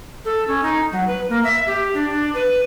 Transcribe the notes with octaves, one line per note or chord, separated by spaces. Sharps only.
A4
C#4
D#4
F#3
B4
A#3
E5
G4
D4
D4
B4